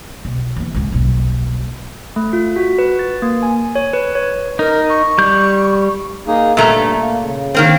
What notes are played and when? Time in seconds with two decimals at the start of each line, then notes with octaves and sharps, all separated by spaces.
0.25 B1
0.56 E3 B3
0.74 C#2 G#2
0.92 D#1 B1
2.16 A3
2.33 F4
2.56 F#4
2.79 B4
2.99 A6
3.22 A#3
3.43 G#5
3.75 C#5
3.93 B4
4.15 C#5
4.59 D#4 A#4
4.90 C#6
5.18 G3 G6
6.27 A#3 D#4 G#4
6.57 A#2 G3 A3 A#4 E5 A#5
6.71 G2
7.00 A#3
7.21 C#3
7.55 D#3 A#3 C4